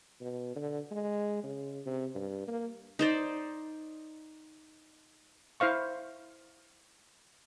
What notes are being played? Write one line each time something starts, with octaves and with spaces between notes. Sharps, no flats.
B2
D3
G#3
C#3
C3
G2
A#3
D#4 C5 D5
E4 C5 F5 C#6